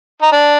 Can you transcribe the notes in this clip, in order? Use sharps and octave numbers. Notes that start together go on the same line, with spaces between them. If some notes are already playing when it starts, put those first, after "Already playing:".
D#4
D4